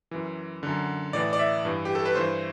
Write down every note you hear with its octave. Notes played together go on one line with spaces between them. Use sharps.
F#2 E3
F#2 D3
A2 E3 D5
D5
E5
G2 E3
G4
A4
B4
G2 E3 C5